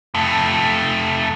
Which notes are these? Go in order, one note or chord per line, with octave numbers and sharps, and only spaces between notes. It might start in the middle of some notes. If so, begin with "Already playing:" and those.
F2 A3